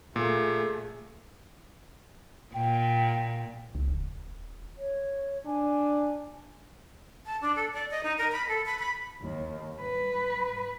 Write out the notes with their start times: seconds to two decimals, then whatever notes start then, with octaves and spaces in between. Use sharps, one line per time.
0.16 A#2 A3 G#4
2.54 A#2 G5
3.75 C#2
3.88 D#1
4.77 C#5
5.46 D4 G#5
7.26 A5
7.42 D4
7.56 A4
7.73 D5
7.91 D#5
8.04 D#4
8.18 A#4
8.32 B5
8.49 A4
8.66 B5
8.79 B5
9.21 D#2
9.81 B4